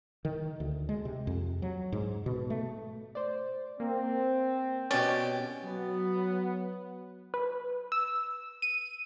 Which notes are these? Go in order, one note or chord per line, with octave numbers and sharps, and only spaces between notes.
D#3
D2
G#3
C3
F2
F#3
G#2
B2
A3
C5 D5
A#3 C4
B2 C#4 G4 D5
F#3 B3
B4
E6
D#7